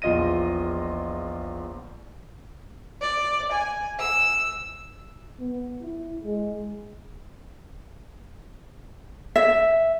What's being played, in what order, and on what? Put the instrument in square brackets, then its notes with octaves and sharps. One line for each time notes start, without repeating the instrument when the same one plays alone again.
[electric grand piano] A#1 E2 F4 D#5 A#6 D#7
[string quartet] D5
G#5
E6
[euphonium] B3
E4
G#3
[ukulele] E5